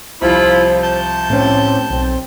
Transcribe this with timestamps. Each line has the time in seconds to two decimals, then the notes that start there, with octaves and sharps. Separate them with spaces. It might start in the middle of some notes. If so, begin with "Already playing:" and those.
0.21 C2 F3 E4 F4 C5 B5
0.83 A5 G6
1.30 A2 C4 C#4
1.90 B1 C4